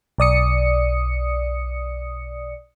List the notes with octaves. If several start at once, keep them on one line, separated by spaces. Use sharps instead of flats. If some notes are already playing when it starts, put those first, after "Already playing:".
B1 D5 D#6 C#7